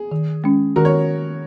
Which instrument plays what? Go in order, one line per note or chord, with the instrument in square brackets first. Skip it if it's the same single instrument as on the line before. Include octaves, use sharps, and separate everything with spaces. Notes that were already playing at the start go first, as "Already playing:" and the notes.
Already playing: [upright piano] G#4
[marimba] D#3
G#3 C#4
[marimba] D#3 [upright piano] F#4 A#4
[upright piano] C#5